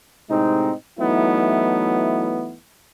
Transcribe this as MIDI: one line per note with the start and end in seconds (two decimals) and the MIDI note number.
0.30 0.73 45
0.30 0.73 48
0.30 0.73 56
0.30 0.73 60
0.30 0.73 63
0.99 2.55 52
0.99 2.55 54
0.99 2.55 57
0.99 2.55 59
0.99 2.55 63
0.99 2.55 64